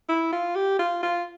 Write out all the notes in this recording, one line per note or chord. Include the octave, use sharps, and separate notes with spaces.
E4
F4
G4
F4
F4